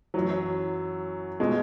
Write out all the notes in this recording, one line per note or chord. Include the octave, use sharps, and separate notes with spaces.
F#2 E3 F#3
B2 G#3